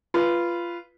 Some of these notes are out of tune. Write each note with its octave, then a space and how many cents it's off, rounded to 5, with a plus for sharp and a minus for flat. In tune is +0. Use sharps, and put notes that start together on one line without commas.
F4 -15 B4 -5